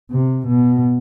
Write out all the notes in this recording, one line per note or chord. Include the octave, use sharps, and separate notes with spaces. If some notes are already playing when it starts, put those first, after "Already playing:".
C3
B2